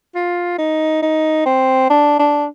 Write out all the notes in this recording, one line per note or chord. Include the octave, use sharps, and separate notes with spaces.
F4
D#4
D#4
C4
D4
D4